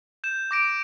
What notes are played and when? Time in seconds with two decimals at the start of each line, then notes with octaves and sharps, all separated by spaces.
0.24 G6 E7
0.51 D6 A#6 D7